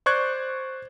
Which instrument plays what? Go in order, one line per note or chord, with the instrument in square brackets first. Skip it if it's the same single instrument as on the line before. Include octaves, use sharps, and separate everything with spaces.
[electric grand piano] C5 D5 C#6 F#6 G#6